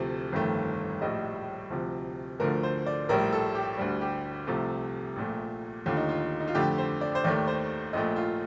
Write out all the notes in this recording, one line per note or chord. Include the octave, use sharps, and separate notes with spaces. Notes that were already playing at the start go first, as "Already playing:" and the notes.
Already playing: D2 C3 F3 A3
G1 F2 D#3 A3
A#1 A2 G3 D#5
D2 C3 F3
D2 D3 F3 A3 A#4
C5
D5
A#1 A2 G3 A#4
A4
G4
D2 D3 G3
G4
C2 C3 F3 A3
A#1 A#2 A3
D#2 D3 A3 F4
D#4
F4
D#4
F4
F2 D3 A3 G4
C5
D5
C5
D#2 D#3 A3 D5
C5
A#1 A#2 A3 D#5
F4